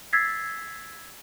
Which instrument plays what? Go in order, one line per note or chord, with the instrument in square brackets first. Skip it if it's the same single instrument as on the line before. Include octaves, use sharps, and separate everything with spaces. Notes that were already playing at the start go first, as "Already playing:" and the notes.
[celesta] E6 G#6 A6 B6 C7